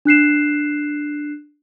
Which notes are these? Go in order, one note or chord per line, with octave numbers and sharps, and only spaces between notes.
D4 F#6 C7 E7